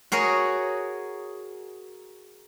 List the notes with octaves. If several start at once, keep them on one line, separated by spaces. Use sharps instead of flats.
F#4 G#4 A#4 C#5